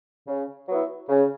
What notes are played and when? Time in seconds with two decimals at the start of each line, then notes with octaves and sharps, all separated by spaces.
0.27 C#3
0.68 F#3 B3 E4
1.09 C#3